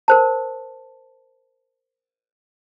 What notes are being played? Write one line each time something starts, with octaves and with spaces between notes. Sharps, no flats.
A#4 C5 A5